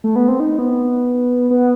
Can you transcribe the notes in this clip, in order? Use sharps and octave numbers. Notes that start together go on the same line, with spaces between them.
A3
B3
C4
D#4
B3
B3